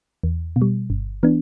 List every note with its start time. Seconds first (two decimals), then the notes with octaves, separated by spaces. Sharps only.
0.23 E2
0.56 B2
0.62 G3
0.90 G1
1.23 E3 B3 D4